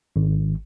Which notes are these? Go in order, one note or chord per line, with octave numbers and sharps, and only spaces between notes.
G#1